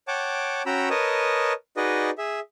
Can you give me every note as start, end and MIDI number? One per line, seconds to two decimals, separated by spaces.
0.08 0.62 73
0.08 0.62 78
0.08 0.62 79
0.08 0.62 81
0.08 0.62 86
0.66 0.89 61
0.66 0.89 66
0.66 0.89 79
0.66 0.89 82
0.66 0.89 83
0.66 0.89 88
0.90 1.53 70
0.90 1.53 71
0.90 1.53 73
0.90 1.53 75
0.90 1.53 81
0.90 1.53 87
1.77 2.10 63
1.77 2.10 66
1.77 2.10 68
1.77 2.10 71
1.77 2.10 74
1.77 2.10 75
2.18 2.40 68
2.18 2.40 76